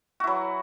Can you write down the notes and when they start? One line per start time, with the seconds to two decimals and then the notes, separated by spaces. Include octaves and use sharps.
0.20 F#4
0.24 E4
0.27 F#3